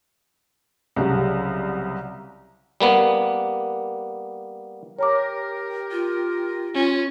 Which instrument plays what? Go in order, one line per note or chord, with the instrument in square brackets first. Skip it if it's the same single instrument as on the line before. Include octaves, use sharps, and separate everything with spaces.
[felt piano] C2 C#3 F#3
[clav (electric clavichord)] G3 A#3 B3
[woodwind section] G4 A#4 [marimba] C#5 A#5 D6
[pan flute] F4
[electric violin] C#4 [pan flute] F4